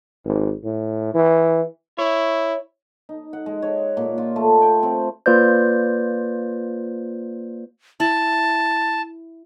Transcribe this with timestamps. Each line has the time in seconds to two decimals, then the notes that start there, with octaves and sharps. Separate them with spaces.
0.25 G#1
0.64 A2
1.14 E3
1.99 E4 C#5
3.09 D#4
3.33 F#5
3.46 G#3
3.62 C#5
3.97 A#2
4.18 F4
4.36 A3
4.62 G5
4.83 C4
5.26 A#3 F4 B4 C5 D5 G6
8.00 E4 A5